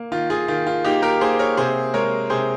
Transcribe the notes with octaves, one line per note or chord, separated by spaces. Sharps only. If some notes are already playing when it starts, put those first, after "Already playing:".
Already playing: A#3
D#3 F4
F4 G#4
D#3 F4
F4
A#3 D#4 G4
G4 A#4
A#3 G#4 C5
A#4 C#5
C3 G#4 C5
G#3 A#4 C#5
C3 G#4 C5